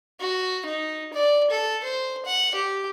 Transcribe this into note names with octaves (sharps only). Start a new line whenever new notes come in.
F#4
D#4
D5
A4
C5
F#5
G4